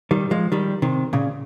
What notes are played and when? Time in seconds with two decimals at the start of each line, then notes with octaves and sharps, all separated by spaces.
0.11 D#3 G3
0.31 F3 G#3
0.52 D#3 G3
0.82 C3 D#3
1.13 A#2 C#3